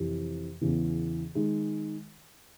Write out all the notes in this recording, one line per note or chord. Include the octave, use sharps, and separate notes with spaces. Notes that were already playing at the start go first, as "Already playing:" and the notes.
Already playing: F2 C3 E3
E2 C#3 E3
D#3 G#3